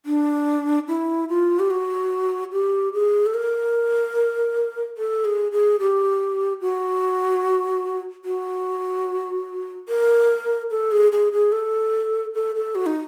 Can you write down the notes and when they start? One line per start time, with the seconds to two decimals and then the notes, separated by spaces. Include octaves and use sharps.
0.06 D4
0.88 E4
1.29 F4
1.59 G4
1.70 F#4
2.52 G4
2.93 G#4
3.26 A4
3.34 A#4
4.97 A4
5.25 G#4
5.52 G#4
5.79 G4
6.61 F#4
8.25 F#4
9.89 A#4
10.70 A4
10.91 G#4
11.12 G#4
11.32 G#4
11.52 A4
12.34 A4
12.55 A4
12.75 F#4
12.86 D#4